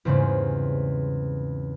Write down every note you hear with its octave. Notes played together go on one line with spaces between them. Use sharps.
E2 G#2 C#3 G3 G#3 C4